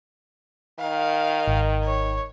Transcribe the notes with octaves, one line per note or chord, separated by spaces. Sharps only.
D#3 F5
G#1
C#5